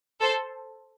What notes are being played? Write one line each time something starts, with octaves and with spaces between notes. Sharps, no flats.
A4 C5